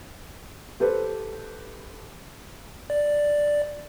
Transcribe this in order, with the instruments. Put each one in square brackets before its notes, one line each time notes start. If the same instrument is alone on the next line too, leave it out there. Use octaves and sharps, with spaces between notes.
[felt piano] G4 A4 B4 C5
[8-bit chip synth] D5